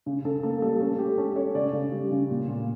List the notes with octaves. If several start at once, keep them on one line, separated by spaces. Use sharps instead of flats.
C#3
C#3 A4
A#3 A4
G3 A4
C#4 A4
C#4 G4
C#4 A4
C#4 C#5
C#3 D5
C#3
G3
C#3
A#2
A#2